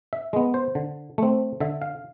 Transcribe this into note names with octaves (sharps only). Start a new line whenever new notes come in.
E5
G#3 B3
C5
D3
A3 C4
D3 E5
F5